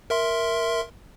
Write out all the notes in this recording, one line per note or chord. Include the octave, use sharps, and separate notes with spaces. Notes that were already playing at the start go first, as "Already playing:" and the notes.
A#4 E5 C6